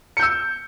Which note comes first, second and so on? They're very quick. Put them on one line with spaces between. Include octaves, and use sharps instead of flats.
C#7 G6 E6